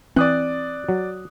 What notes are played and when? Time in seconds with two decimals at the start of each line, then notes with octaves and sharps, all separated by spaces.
0.16 E3 C4 D5 D#6 F#6
0.89 F#3